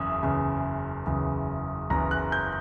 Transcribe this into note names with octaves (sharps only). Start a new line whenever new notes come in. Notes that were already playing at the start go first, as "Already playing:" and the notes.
Already playing: F#1 E2 C#3 E5
F#1 E2 C#3
F#1 E2 C#3
F#1 E2 C#3 A#5
F#6
G6